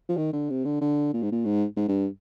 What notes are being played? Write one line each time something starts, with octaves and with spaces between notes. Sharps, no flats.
F3
D#3
D3
C3
D3
D3
A#2
G#2
A#2
G#2
G#2
G2